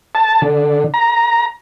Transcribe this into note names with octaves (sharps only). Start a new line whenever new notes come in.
A5
D3
A#5